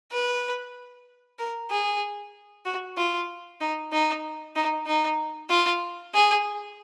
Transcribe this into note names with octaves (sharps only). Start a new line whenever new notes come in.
B4
A#4
G#4
F#4
F4
D#4
D#4
D#4
D#4
F4
G#4